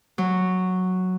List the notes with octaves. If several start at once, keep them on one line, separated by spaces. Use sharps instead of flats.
F#3